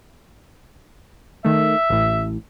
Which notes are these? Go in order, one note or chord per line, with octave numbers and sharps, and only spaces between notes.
D#3 A3 E5
A1 A2